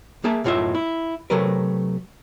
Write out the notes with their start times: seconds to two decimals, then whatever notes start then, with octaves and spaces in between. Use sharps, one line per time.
0.24 A#3 G#4 E5 A5
0.44 B1 F#2 A2 F4 D#5 E5
0.75 E4
1.30 C3 F#3 A3 A#4 B4